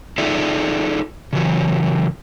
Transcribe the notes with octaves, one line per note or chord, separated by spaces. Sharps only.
D#4 F4 G#4 A4 D5 E5
C#3 E3 F#3